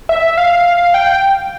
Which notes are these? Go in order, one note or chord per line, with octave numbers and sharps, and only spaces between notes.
E5
F5
G5